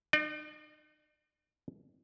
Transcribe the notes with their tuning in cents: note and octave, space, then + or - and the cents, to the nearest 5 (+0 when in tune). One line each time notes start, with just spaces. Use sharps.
D#4 -40 D5 +35